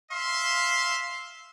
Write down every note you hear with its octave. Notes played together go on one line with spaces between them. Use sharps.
E5 F5 C6